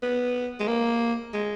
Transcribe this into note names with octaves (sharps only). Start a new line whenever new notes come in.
B3
G#3
A#3
G#3